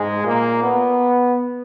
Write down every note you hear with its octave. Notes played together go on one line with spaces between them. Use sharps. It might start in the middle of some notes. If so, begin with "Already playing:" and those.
Already playing: G#2 G#3
A#2 A#3
B3